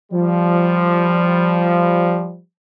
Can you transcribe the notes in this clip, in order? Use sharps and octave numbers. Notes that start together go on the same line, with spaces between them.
F3 G3